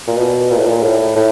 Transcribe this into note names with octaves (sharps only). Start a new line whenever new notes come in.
A#2
B2
A#2
A2
A#2
A2
A2